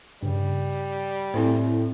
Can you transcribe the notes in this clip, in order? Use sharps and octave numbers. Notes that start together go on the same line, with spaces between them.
G2 C#3 G3
A2 C4 E4 C5